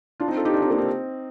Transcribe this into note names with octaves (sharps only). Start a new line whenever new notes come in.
D4 F4
C4 D#4
F4 A4
D#4 G4
D4 F4
C4 D#4
A#3 D4
C4 D#4